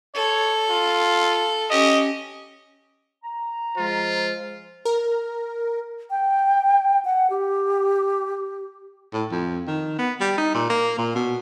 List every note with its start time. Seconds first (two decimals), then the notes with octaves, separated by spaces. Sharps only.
0.15 A4 C#5
0.70 F4
1.70 C#4 G4 D#5
3.24 A#5
3.77 F3 G#3 F4 C5
4.85 A#4
6.10 G5
7.05 F#5
7.30 G4
9.13 A2
9.32 F2
9.67 D#3
9.99 B3
10.20 G3
10.38 D#4
10.54 A#2
10.70 A#3
10.98 A#2
11.15 B2